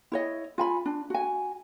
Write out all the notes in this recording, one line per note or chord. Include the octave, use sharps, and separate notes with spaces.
E4 C#5 D#5
F4 G#5 B5
D4
F#4 G#5